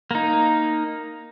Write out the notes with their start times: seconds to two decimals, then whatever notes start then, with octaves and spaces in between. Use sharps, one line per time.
0.11 A#3 D#4